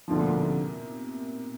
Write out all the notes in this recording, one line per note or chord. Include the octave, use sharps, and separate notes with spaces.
D2 B2 D3 F3
A#2
A#2
C3